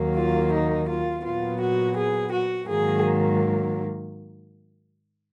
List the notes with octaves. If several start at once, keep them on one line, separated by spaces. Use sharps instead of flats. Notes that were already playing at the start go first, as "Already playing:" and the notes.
Already playing: D#2 D#3 F#3 A#3
F4
D#4
F4
A#2 F#3 B3 F4
F#4
G#4
F#4
G#2 D#3 F#3 A#3 G#4